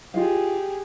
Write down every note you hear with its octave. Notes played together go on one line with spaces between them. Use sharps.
F4 G4 G#4 D#5 F5